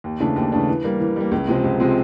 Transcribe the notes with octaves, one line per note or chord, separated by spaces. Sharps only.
D#2
C#3 E3 A3 D4
D#2
C#3 E3 A3 D4
E3
G3 A#3
E3
G3 A#3
C#2
C3 F3 G#3 C4
C#2
C3 F3 G#3 C4